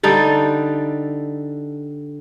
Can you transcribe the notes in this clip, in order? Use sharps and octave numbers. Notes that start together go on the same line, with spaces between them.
D3 G3 D#4 A4